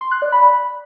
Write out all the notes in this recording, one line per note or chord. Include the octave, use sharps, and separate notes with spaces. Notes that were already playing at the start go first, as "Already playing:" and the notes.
C6
F#6
D5
B5
B5